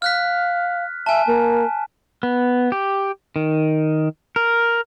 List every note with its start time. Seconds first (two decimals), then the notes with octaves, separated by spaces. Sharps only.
0.02 F5 F6 F#6 B6
1.06 E5 G#5 A5
1.27 A#3
2.23 B3
2.72 G4
3.36 D#3
4.36 A#4